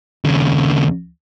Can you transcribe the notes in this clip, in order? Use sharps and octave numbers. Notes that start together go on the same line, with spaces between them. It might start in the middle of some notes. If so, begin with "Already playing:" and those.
D#2 C#3